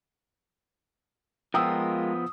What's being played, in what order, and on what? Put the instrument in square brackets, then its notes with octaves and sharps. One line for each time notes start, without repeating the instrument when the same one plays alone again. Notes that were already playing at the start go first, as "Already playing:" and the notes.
[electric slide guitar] F3 B3 [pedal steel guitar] G#3 F4 A#4 [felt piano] G5 D#6 E6